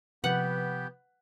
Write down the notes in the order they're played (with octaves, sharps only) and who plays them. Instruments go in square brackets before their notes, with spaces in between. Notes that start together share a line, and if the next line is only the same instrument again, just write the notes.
[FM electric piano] C3 F3 [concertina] B3 G4 [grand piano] B4 [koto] F#5